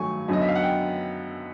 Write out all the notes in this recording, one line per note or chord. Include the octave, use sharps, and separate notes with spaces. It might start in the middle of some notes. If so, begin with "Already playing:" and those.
Already playing: G2 D#3 F#3 A3 G#5 C#6
F#2 D3 F#3 B3 D#4 D#5
E5
F5
F#5
G5